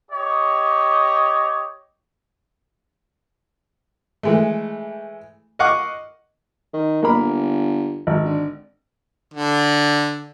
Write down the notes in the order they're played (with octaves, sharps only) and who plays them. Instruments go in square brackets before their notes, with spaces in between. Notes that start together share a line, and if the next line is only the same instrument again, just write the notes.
[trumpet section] G4 C#5 D#5
[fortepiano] E3 G#3 A3
D#5 F5 F#5 C#6 D6
[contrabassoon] D#3
[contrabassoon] G1 [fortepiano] A#3 A#4 B5
[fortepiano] G#1
[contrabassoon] D3
[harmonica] D3